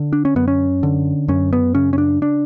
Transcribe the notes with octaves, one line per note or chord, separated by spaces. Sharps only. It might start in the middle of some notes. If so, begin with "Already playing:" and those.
Already playing: D3
D4
C#4
F#2 B3
C#4
D3
F#2 C#4
B3
C#3 C#4
C#4
D4
D4